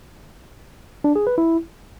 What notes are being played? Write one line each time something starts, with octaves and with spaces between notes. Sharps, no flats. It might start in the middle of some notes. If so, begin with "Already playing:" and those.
D4
G#4
B4
E4